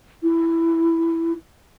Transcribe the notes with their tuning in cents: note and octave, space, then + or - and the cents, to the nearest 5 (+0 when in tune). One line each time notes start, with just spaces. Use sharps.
E4 +5